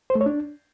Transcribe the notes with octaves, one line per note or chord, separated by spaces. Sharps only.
C5
A3
C#5
D4